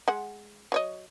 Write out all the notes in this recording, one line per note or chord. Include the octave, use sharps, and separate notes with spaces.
G#3 F#5
F#3 C#5 D#5